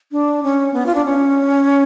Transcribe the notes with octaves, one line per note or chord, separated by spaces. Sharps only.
D4
C#4
B3
F4
D4
C#4